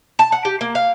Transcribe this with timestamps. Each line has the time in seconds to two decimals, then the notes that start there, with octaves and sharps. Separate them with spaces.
0.19 A5
0.32 F#5
0.45 G4
0.61 A#3
0.75 F5